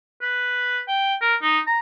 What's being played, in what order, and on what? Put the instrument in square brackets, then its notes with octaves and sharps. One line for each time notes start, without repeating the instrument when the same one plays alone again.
[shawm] B4
G5
A#4
D#4
A#5